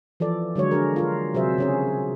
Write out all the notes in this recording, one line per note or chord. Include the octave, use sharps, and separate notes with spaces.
E3 F3 A4 D5
D3 F#3 G#3 C#5
D4 G#4 A#4
F4 A#4
C3 F#3 G#4 C5 E5
C#3 C#4 G#4